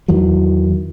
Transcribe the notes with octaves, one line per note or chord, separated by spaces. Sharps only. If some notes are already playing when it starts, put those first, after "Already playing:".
E2 D#3 E3 F#3